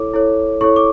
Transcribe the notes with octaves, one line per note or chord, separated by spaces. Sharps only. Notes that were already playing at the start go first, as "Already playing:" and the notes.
Already playing: E4 A4 C#5 D6
E4 A4 C#5
E4 A4 C#5 C#6
D6